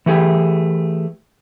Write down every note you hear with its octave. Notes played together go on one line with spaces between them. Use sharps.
E3 A3 G4 G#4